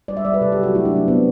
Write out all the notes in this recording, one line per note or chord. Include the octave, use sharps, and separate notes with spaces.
G3 D5
E5
G3 D5
B4
C3 A4
G4
F#3 F#4
A3 E4
D4
F#3 C4
C3 B3